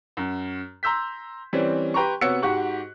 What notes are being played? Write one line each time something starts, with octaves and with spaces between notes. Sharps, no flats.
F#2
A#5 C6 E6 G6 B6
E3 G3 C4 C#4
G4 B4 G5 A#5 C6 C#6
C3 B3 F#4 C#5 E6 C#7
G#2 F#4 G4 C#6 F#6